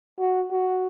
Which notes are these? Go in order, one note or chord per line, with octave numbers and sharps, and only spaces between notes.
F#4
F#4